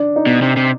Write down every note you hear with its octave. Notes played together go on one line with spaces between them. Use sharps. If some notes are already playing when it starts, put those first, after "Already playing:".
Already playing: D4
D#4
B2
C3
C3